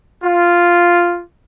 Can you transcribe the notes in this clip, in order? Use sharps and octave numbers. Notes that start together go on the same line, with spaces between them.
F4